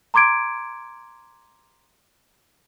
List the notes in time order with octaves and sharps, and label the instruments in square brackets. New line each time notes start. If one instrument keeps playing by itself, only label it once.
[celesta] A#5 C6 D6 G#6 D7